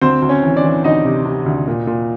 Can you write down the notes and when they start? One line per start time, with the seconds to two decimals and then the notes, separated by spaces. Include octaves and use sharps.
0.01 D2 C4 C5
0.22 D2
0.29 C#4 C#5
0.43 E3
0.57 D4 D5
0.64 E3
0.84 D2 D#4 D#5
1.05 C3
1.25 C3
1.46 D2
1.68 A#2
1.87 A#2